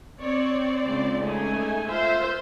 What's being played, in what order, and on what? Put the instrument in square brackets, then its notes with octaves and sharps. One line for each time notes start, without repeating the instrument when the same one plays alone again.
[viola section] C4 D5 [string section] C#5
[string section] C#2
[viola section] A3 D#4 G#5
F4 C5 E5